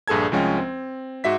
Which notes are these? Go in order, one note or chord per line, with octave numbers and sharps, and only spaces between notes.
A#1 G2 G#4 A4 A5 G#6
C2 F3 G#3 C#4 D#5 G5
C4
G#2 F#4 E5 B6